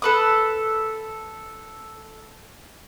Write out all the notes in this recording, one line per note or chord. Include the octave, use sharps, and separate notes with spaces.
A4 B4 D#6